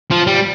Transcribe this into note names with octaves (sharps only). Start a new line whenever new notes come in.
F3
G3